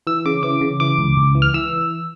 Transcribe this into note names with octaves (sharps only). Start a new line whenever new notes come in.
E3 E6
C#3 D6
E3 D6
C#3
E3 D6
C#2
C#2
E3
F6
E3 E6